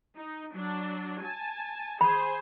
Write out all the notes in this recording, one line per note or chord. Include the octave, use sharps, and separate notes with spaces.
D#4
F#3 D4
G#5 A5
G#4 C5 G#5 B5